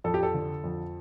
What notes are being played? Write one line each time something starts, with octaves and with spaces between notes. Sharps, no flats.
F2 A4
G4
A4
D3
F2